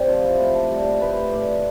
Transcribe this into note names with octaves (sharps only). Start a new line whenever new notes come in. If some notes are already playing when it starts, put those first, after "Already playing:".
Already playing: C4 G4 D5
F3 F4
E4
A2 F4
G4 A4
G3
G4
A2 B4
A2 D5